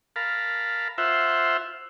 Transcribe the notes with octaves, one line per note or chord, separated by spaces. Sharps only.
A#4 F5 A5 B5
F4 C5 E5 F#5